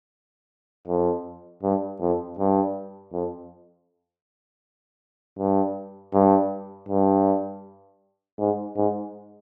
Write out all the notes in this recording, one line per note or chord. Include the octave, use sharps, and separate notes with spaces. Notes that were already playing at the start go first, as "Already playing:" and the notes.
F2
G2
F2
G2
F2
G2
G2
G2
G#2
G#2